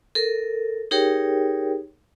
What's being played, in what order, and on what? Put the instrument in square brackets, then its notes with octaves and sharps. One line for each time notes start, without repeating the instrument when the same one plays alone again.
[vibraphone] A4 A#4
D#4 G4 G#4 A#4 C#5 G5